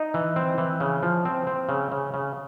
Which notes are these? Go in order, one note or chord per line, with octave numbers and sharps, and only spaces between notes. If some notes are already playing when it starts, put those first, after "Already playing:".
Already playing: D#4
E3
C4
E3
C#3
F3
C4
C4
C#3
C#3
C#3